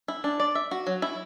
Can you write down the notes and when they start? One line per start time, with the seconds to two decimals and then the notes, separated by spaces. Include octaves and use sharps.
0.08 E4
0.24 D4
0.40 D5
0.55 E5
0.71 F#4
0.87 F#3
1.02 E4